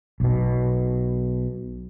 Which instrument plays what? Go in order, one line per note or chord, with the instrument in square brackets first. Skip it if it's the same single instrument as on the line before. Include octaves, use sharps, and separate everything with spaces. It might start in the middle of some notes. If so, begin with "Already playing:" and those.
[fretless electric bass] B1 B2